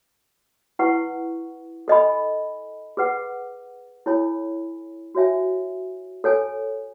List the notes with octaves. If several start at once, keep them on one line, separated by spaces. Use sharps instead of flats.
E4 B4 F#5 C#6
A4 D#5 G#5 B5
G#4 B4 F#5
E4 A4 C#5 G#5 B5
F#4 C#5 E5 G#5
A4 C#5 G#5